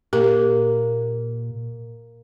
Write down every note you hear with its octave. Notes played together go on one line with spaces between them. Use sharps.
A#2 A#3 G4